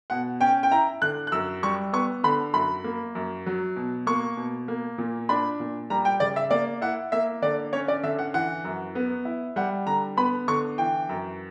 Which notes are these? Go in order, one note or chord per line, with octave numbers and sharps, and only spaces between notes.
B2 F#5
C#4 G5
G5
E4 A#5
D3 F#6
F#6
F#2 E6
G3 C#6
B3 C#6
D3 B5
F#2 B5
A#3
F#2
F#3
B2
A#3 C#6
B2
A#3
A#2
D4 B5
A#2
G3 A#5
G5
C#3 D5
E5
A#3 D5
E4 F#5
A#3 E5
D3 D5
C#4 C#5
D5
D3 E5
F#5
E3 F#5
F#2
B3
E4
G3 F#5
D3 A#5
B3 B5
D3 C#6
E3 G5
F#2